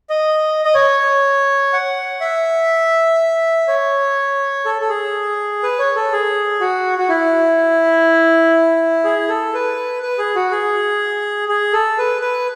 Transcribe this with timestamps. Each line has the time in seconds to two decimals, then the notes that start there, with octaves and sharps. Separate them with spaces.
0.10 D#5
0.65 D#5
0.74 C#5
1.73 F#5
2.21 E5
3.68 C#5
4.65 A4
4.82 A4
4.89 G#4
5.63 B4
5.79 C#5
5.96 A4
6.12 G#4
6.60 F#4
6.98 F#4
7.09 E4
9.04 G#4
9.29 A4
9.54 B4
10.02 B4
10.18 G#4
10.35 F#4
10.51 G#4
11.48 G#4
11.73 A4
11.98 B4
12.22 B4